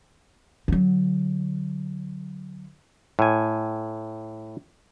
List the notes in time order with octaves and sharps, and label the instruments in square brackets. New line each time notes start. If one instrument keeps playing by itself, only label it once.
[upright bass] D3 F#3
[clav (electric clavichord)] A2 G#5